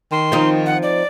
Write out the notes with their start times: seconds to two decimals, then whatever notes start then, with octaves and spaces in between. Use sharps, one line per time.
0.12 D#3 C6
0.32 F3 C4 D#4
0.66 F#5
0.83 D5